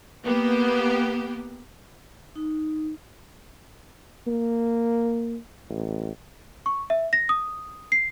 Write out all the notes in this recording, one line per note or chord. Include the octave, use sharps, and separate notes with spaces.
A#3 B3 G4
D#4
A#3
A1
C#6
E5
A#6
D#6
C7